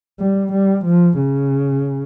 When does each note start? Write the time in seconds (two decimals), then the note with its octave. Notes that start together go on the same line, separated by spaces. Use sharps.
0.19 G3
0.52 G3
0.85 F3
1.18 C#3